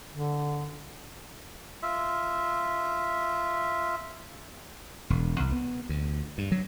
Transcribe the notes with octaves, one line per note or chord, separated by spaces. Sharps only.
D3
F4 E5
E1
C2
B3
D2
G2
F#3